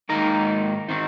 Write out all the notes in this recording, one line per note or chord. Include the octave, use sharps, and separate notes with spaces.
G#2 D#3 A#3 D#4 A#5
D#3 C4 D#4